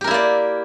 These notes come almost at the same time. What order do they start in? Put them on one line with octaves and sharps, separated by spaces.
G4 A#4 E4 A#3 D5